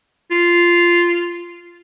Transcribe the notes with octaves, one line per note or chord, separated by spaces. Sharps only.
F4